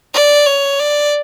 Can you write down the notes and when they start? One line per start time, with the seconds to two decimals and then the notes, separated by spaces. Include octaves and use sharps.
0.14 D5
0.46 C#5
0.79 D5